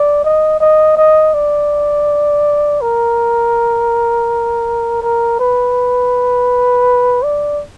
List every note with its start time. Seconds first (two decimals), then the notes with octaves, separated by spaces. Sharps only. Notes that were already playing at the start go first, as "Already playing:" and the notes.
Already playing: D5
0.24 D#5
0.60 D#5
0.97 D#5
1.34 D5
2.81 A#4
5.02 A#4
5.40 B4
7.24 D5